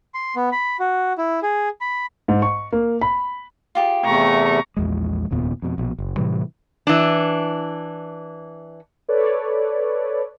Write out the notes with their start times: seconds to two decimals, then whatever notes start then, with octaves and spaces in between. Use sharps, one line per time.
0.14 C6
0.36 B3
0.52 B5
0.80 F#4
1.18 E4
1.43 G#4
1.81 B5
2.28 G#2
2.42 C#6
2.72 A#3
3.01 B5
3.75 F4 G4 G#4
4.05 E2 C3 A3 A#5 C#6
4.77 A#1 E2 G#3
5.31 F1 D#2 A#2 B3
5.62 F2 B2
5.78 A#1 B2
5.99 F#1
6.16 A2 C3 E3 G3
6.87 E3 D4
9.08 A4 B4 C#5 D5